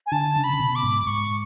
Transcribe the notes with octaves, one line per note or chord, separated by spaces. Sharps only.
G#5
D3 A5
C#3
B5
C#3
B2
D6
G#2
G#2 C#6